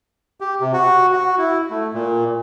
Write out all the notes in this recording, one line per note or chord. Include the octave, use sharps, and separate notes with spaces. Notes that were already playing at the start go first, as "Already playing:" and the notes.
G4
C3
F#4
F#4
E4
A3
A#2